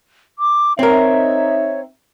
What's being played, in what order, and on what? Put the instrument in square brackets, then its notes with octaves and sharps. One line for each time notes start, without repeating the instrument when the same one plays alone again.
[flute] D6
[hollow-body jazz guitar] C4 A#4 [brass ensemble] D#4 E5 [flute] C#5